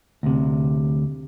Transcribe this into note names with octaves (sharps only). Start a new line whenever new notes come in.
D2 C3